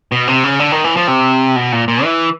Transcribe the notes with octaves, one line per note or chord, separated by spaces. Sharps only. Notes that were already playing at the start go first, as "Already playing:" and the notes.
B2
C3
C#3
D3
D#3
E3
F3
C3
B2
A#2
A#2
E3